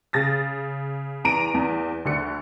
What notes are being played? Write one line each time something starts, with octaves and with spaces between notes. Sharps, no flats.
C#3 A6 A#6
E2 A#5 D7 D#7
E2
D2 D3 C#7